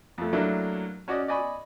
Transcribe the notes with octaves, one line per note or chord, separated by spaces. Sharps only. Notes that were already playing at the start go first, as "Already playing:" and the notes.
F2 A3
F#3 A3 A#3 D4 E4
C#4 F#4 D5 D#5
D5 D#5 G#5 B5 C#6